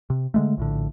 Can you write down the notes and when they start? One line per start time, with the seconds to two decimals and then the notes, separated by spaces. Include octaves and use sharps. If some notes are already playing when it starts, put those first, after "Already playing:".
0.10 C3
0.34 D3 G#3 A3
0.57 A#1 A2 D3